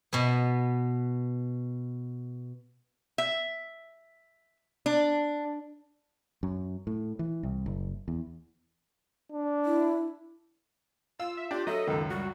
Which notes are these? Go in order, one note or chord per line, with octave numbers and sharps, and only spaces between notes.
B2 B3
E5
D4
F#2
A2
E3
C2
F#1
E2
D4
E4
F4 F5 E6
E5
D4 F4 G4
F#3 A4 D#5 E5
C#2 F#2 D#3
G3 F#4